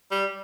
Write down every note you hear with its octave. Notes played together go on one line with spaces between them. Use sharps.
G3